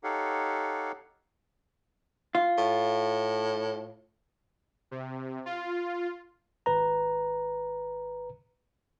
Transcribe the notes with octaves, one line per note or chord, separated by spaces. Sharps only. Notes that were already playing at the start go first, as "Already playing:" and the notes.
D#4 G4 A4 C#5 F5 F#5
F4
A2
C3
F4
G#1 B4 A#5